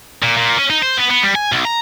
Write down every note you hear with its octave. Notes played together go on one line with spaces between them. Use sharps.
A#2
A#2
C#4
D#4
C5
B3
B3
G3
G#5
B1
A#5